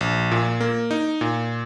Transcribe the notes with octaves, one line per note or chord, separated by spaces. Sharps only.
A#1
A#2
A#3
D#4
A#2